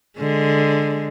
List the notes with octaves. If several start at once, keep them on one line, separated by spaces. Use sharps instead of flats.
D3 G#3